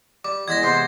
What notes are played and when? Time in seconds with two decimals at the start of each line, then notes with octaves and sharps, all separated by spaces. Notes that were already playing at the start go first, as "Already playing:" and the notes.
0.24 G3 D6
0.48 E2 G#3 B5 G#6 A#6
0.63 C3 G#3 B3 C5